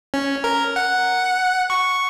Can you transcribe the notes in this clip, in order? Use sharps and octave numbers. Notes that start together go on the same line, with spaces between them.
C#4
A#4
F#5
C#6